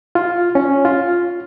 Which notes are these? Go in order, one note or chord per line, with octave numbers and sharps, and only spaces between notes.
F4
C#4
F4